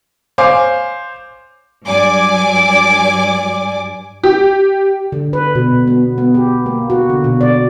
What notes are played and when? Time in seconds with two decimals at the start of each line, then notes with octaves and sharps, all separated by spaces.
0.38 C5 C#5 F5 G#5 D6
1.86 G2 F#3 D5 G#5 D6
4.23 G4
5.12 D3
5.33 B4
5.55 B2
5.87 B3
6.18 B3
6.35 G4
6.66 A#3
6.90 F#4
7.10 D3
7.24 B2
7.41 D5